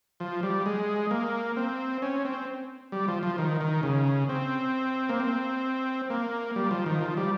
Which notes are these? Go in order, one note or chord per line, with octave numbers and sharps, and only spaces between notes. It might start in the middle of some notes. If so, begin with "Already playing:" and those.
F3
G3
G#3
A#3
C4
C#4
C4
G3
F3
F3
D#3
D#3
C#3
C4
A#3
C4
A#3
G3
F3
D#3
F3
G3